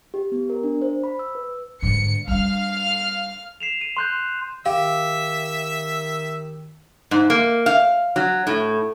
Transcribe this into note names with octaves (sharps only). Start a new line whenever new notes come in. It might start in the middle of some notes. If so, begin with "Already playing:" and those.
G4
B3
A#4
D4
C5
B5
E6
B4
G#2 D3 C#7
G3 D4 F5 F6
C7 E7 F7
D#7
C6 F#6 G6
D#3 G4 E5 F5 E6
G#2
A#3
F5
F#3
A2